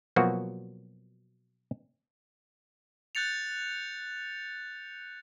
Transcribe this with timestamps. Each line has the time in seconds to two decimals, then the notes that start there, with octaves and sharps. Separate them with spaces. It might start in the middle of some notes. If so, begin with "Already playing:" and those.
0.16 B2 F3 F#3 A#3 F#4
3.15 F#6 G6 A6 C#7 F7